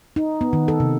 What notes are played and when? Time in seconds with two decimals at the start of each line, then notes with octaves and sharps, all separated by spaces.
0.16 D#4
0.41 B3
0.53 D#3
0.68 A4
0.80 C3